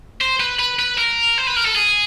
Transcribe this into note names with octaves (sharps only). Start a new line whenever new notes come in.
C5
B4
B4
B4
A#4
C5
B4
A#4
A4
G#4